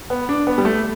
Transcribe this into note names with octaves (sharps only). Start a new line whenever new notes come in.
B3
D4
B3
G3
A3